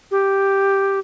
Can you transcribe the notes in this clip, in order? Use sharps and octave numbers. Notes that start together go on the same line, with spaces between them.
G4